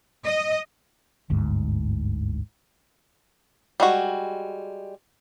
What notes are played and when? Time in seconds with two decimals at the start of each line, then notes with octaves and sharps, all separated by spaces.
0.25 D#5
1.30 G1 D2 G#2
3.80 G3 G#3 F#4